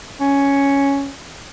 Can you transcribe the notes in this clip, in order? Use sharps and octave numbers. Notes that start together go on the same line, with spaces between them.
C#4